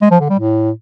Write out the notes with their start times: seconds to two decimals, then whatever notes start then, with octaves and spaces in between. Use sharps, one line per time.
0.02 G#3
0.11 F3
0.20 D3
0.30 G3
0.39 A2